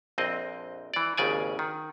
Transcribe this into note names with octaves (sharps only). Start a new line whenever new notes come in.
A#1 F2 C4 D#5
E3 D5
G#1 D#2 C#3 D5 G#5
D#3